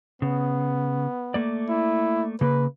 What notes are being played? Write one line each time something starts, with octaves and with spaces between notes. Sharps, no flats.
C#3 B3
A3 A#3 D5
E4
C#3 A#3 B4